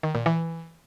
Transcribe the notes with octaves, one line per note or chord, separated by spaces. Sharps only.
D#3
A#2
E3